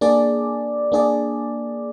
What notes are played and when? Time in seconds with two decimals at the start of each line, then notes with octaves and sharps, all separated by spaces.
0.01 A#3 D4 G#4 D5
0.92 A#3 D4 G#4 D5